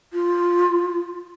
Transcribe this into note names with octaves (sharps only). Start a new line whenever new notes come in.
F4